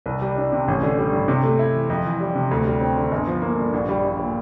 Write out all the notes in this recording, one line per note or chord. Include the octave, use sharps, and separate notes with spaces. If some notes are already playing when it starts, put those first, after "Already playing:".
C2
G3
D4
C3
A1
D3
G3
G2
C3
A3
E4
E3
F2
E3
G3
C3
D2
G3
C4
D3
G1
F3
A#3
G2
A#1
G3
A#1
A#2